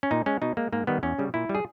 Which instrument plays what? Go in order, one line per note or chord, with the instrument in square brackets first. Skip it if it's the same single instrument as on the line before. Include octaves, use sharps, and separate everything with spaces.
[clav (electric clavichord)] C#4
A#2 D#4
G#3 C#4
B2 D#4
G#3 A#3
G#2 A#3
D#3 G3 B3
E2 C#4
C#3 G3
A#2 E4
G3
G#4